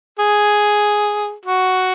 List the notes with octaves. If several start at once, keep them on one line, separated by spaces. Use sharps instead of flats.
G#4
F#4